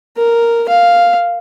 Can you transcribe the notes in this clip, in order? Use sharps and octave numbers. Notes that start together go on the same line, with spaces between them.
A#4
F5